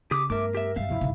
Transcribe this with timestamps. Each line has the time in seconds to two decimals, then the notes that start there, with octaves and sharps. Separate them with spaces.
0.11 C#3 G4 D6 D#6
0.30 G2 A3 B3 A#4 E5 D6
0.55 G4 E5
0.76 G2 G3 B3 C4 E5 F5
0.89 D#1 C3 F3 E4
1.01 G1 C2 G#2 C#3